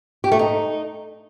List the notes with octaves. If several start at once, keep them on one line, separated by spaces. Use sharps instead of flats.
G4
A3
D#4